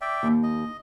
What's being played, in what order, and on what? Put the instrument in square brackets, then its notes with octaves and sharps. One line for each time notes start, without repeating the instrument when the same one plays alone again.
[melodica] D5 E5 G5
[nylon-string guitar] D#2
[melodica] D#5